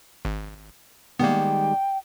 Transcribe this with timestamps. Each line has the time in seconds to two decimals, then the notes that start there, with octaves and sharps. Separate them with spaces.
0.25 G#1
1.19 D#3 G3 G#3 A#3 B3 G5